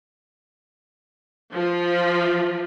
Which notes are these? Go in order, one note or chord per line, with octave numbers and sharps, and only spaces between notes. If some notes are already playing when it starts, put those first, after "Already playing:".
F3